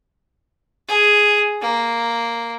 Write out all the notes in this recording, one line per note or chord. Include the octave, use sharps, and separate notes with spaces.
G#4
A#3